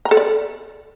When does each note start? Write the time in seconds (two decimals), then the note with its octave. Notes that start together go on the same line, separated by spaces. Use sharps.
0.05 A#5
0.11 A4
0.17 D5